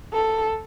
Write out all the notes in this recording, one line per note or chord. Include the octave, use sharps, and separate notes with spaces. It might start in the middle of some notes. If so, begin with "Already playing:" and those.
A4